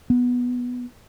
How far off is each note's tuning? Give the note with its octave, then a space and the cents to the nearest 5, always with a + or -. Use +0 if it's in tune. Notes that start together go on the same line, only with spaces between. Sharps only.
B3 -5